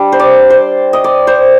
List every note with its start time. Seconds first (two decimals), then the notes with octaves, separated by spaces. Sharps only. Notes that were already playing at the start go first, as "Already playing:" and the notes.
Already playing: G3 D4
0.12 C5
0.20 D5
0.50 C5
0.93 D#5
1.04 D5
1.27 C5